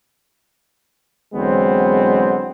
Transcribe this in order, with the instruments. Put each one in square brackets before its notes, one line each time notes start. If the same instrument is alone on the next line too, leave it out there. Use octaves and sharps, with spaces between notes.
[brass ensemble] E2 D3 F#3 G#3 B3 C4